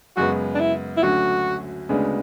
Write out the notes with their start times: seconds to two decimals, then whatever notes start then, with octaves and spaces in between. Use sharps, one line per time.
0.16 F#2 C#3 G#3 B3 F#4
0.55 D4
0.59 E4
0.97 E4
1.03 D2 D3 F#3 C#4 F#4
1.89 D2 C#3 G#3 B3 D4